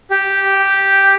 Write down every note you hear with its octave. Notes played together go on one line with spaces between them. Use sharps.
G4